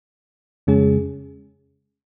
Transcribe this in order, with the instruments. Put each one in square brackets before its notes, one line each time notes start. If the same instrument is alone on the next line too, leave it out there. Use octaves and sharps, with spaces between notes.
[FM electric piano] F2 C#3 G#3 C#4 G#4